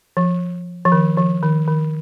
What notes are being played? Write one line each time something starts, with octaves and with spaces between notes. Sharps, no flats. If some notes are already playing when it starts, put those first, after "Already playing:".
F3
F3
D#3
F3
D#3
D#3